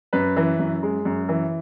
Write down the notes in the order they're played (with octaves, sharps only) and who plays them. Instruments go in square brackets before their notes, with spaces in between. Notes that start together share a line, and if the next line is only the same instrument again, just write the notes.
[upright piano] F#2 B4
E3
F#2
G#3
F#2
E3